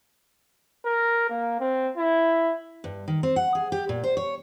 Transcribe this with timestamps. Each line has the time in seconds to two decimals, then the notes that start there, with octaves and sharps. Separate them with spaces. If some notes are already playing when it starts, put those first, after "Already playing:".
0.85 A#4
1.30 A#3
1.60 C4
1.98 E4
2.84 G2
3.08 D#3
3.23 C4
3.36 F#5
3.55 G#4
3.72 G4
3.89 A#2
4.04 C5
4.17 C#5